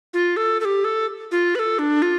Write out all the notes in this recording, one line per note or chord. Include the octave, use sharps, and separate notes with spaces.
F4
A4
A4
G4
A4
F4
B4
A4
D4
F4